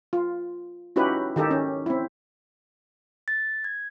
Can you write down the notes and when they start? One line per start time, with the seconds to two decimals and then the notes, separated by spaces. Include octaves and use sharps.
0.13 F4
0.96 C#4 D#4 E4 F#4 G4 B4
1.36 D#3 D#4 G4 A4
1.51 C#4
1.86 C4 E4
3.28 A6
3.64 G#6